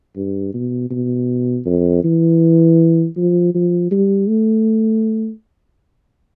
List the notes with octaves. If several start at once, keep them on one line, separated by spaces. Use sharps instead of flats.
G2
B2
B2
F2
E3
F3
F3
G3
A3